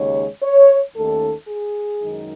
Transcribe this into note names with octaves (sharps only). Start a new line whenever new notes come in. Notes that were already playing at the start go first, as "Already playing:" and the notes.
Already playing: D#2 C#3 G#3 D#4 C#5
C#5
D#2 D#3 A3 C#4 A4
G#4
F#2 D#3 G#3 D#4